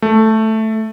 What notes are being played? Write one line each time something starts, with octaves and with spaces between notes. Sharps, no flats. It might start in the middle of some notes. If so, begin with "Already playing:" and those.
A3